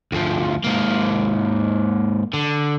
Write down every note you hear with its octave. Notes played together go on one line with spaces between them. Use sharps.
D2 F3
G#2 A#3
D3